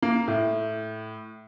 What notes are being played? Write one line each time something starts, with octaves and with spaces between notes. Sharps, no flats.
A#3
A2